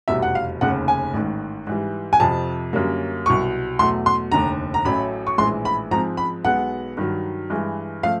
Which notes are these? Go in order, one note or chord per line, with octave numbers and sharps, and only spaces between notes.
F1 E2 B2 G3 E5
F#5
F5
F1 D#2 C#3 F#5
G#5
A1 G#2 D#3
G#2 E3 G3
G#5
F2 C3 F3 A5
F#2 D3 G3 A#3 C#4
C2 B2 F#3 C#6
E2 B2 F#3 A3 C6
C6
F1 D#2 D3 A#5
A#5
A1 A2 F#3 A3 C#4 B5
C#6
A#1 A2 E3 G#3 C6
B5
G#2 F3 G#3 C4 A#5
B5
B1 B2 G#3 B3 F#5
G2 D#3 F#3
G2 E3 G#3
F3 A3 F5